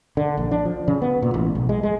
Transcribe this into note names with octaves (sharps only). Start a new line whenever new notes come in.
D3
A#1
D4
F3
C#3
B3
A#2
A1
B1
G#3
G#3